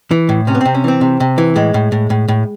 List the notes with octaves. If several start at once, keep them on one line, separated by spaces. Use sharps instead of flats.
E3
A2
C3 C#4
B3
C3 C4
C#4
E3 C4
C3
C3
E3
A2 G#3
A2
A2
A2
A2